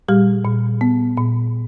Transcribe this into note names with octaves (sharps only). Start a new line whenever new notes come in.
A#2 G3 G4
A#2
B3
A#2